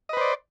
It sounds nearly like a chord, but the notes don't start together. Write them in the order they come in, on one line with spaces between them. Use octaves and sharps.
D#5 B4 C5 D5